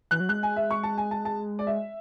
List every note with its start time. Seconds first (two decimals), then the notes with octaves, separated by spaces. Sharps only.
0.11 E3 F#6
0.20 F#3
0.29 G#3 F#6
0.43 G#5
0.56 E5
0.70 C#6
0.83 A5
0.98 G#5
1.11 A5
1.25 A5
1.59 D5
1.67 E5